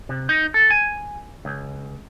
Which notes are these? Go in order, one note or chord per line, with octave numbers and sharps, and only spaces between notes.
C3
D#4
A4
G#5
C#2